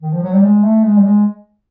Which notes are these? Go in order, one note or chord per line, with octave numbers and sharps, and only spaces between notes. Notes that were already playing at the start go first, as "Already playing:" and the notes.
D#3
F3
F#3
G3
G#3
A3
G#3
G3
G#3